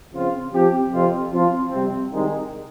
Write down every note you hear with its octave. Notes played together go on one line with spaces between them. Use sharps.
C#3 F3 C4 F4
F3 C4 G4
F2 C3 F3 C4 F4
F3 C4 F4
C3 G3 C4
C2 C3 D#3 G#3 D#4